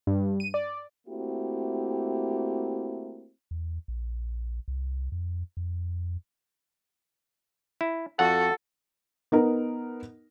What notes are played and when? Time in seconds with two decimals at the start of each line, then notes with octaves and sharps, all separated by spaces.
0.07 G2
0.40 D#7
0.54 D5
1.07 A3 A#3 C4 E4 F#4 G4
3.51 E2
3.88 A#1
4.68 C2
5.12 F2
5.57 F2
7.81 E4
8.19 F2 F#4 A4 F#5
9.32 B3 D#4 A#4